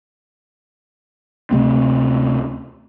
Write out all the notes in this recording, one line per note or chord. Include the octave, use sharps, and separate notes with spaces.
D2 C3 A3 C4